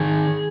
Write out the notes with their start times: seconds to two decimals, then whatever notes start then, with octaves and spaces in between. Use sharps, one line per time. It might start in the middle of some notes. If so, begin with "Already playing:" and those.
Already playing: D#3 G#4